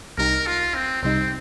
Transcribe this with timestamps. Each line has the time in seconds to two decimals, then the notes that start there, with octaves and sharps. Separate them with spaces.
0.18 C2 C3 G3 D#4 A#4
0.47 F4
0.75 C4
1.02 C2 C3 G3 C4 D#4